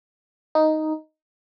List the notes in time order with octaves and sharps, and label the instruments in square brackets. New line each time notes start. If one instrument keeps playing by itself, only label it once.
[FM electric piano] D#4